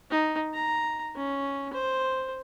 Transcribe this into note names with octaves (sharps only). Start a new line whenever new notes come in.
D#4
A#5
C#4
C5